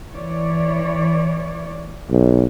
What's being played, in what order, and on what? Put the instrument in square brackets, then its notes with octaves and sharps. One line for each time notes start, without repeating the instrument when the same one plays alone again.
[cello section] E3 C#5 D5
[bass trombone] B1